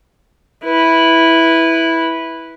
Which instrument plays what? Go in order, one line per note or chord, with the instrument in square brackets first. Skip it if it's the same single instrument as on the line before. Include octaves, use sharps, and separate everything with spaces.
[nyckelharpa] E4 B4